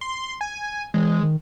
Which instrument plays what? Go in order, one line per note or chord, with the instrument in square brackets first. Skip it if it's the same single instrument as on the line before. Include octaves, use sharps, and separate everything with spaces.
[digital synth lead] C6
G#5
[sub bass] E3 [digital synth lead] G#3
[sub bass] D#3